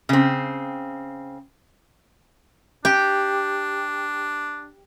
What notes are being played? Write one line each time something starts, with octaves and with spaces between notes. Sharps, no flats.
C#3 C4
D4 G4